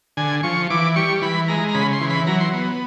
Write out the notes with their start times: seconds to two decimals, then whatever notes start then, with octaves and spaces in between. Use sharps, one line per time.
0.17 D3 G#5
0.43 F3 C#6
0.70 E3 D6
0.96 G3 C#6
1.22 E3 B5
1.48 G#3 A#5
1.68 A#5
1.74 C#3 B5
1.93 C6
2.01 E3
2.10 B5
2.27 F#3 A#5
2.40 C6
2.53 B3